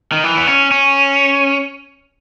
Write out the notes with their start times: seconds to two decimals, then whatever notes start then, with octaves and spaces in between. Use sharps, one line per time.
0.12 D#3
0.24 E3
0.37 B3
0.47 C#4
0.71 C#4